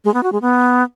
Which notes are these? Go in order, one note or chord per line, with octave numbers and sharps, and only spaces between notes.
G#3
B3
F#4
G#3
B3